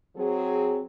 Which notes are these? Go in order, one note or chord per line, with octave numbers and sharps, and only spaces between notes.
F#3 C4 G#4